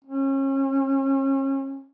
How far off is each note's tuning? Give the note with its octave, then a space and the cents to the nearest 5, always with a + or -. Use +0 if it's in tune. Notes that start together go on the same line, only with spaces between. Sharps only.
C#4 -35